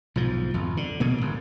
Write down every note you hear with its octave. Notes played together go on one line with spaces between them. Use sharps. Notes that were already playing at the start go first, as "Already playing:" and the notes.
B1 G#2 F3
G#1 F2
D3
A#1 B2 A#3
G1 G#2